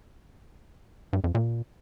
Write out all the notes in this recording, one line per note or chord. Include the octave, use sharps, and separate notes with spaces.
G2
F2
A#2